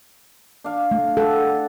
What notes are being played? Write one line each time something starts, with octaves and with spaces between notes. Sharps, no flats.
D4 F5
A3
A4 F#5 G5